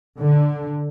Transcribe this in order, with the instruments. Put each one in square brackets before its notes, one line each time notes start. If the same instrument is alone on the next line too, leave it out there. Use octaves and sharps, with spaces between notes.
[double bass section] D3